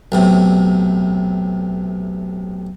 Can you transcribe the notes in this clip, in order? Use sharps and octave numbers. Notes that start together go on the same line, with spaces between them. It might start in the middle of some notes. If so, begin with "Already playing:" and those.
B1 A2 C3